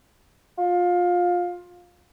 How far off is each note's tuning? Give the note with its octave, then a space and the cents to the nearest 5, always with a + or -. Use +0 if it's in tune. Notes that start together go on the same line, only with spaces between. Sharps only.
F4 +20